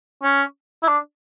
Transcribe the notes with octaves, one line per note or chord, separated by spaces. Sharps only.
C#4
E4
D4